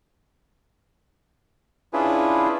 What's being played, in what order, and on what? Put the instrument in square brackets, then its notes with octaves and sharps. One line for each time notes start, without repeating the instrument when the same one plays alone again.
[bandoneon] C#4 D4 E4 F4 G#4 B4